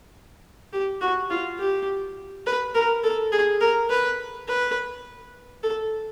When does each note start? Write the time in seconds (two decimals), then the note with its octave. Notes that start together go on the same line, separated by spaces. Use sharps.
0.73 G4
1.01 F#4
1.30 F4
1.59 G4
2.46 B4
2.75 A#4
3.04 A4
3.32 G#4
3.61 A#4
3.90 B4
4.48 B4
5.63 A4